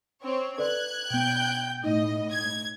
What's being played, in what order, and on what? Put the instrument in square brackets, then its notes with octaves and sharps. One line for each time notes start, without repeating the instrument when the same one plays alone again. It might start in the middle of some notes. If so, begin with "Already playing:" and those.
[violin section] C4 C#5
[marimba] A4 B4 D5 [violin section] F#6 G#6
[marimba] B2 B3 [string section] G5 G6
[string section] A2 [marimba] D#4 [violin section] D#5
[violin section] G#6